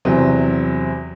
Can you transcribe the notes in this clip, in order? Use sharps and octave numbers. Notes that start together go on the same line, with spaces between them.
E2 C3 F#3 C4